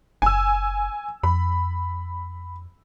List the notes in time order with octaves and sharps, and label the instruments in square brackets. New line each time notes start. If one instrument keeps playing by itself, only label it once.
[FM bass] F#1 [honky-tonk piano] G#5 E6
[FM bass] F2 [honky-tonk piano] B5